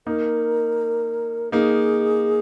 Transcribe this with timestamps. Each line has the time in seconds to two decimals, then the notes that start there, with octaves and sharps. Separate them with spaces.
0.06 A#3 D#4 A#4
1.52 A#3 D#4 G#4